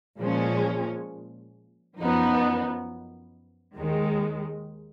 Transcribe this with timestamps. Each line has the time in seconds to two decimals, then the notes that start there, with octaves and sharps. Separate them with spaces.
0.20 A#2 F3 G#3 C#4
1.98 F#2 F3 B3 D#4
3.76 D#2 D#3 G#3